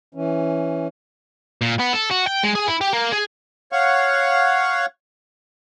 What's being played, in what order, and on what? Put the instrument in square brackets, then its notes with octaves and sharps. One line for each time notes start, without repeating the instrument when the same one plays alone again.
[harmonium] E3 C#4
[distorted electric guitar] A#2
B3
A4
F#4
G5
G#3
G#4
E4
G4
A#3
G#4
[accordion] C#5 F5 F#5 C#6